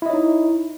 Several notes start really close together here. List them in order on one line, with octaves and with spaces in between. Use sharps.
E4 D#5 C#5 D#4